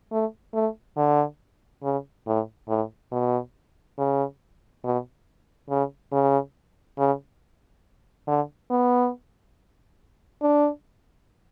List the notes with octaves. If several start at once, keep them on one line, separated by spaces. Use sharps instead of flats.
A3
A3
D3
C#3
A2
A2
B2
C#3
B2
C#3
C#3
C#3
D3
B3
D4